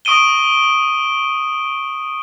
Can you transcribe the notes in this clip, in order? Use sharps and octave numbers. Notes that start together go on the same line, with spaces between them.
C#6 D#6 D7 D#7 G7